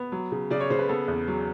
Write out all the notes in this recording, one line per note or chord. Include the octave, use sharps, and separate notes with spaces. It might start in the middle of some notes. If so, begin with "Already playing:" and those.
Already playing: B3
F#3
C#3
C#3 D5
C#5
C#3 C5
B4
B3 A4
E2
F#3